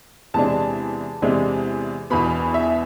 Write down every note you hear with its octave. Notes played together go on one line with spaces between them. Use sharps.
E2 C3 G#3 D4 A5
E2 C3 G#3 D4
E1 E2 B2 B5
E5